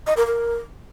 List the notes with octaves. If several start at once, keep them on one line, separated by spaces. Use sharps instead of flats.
D#5
A#4
A#4